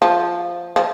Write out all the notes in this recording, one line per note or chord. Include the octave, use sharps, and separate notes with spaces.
F3
F3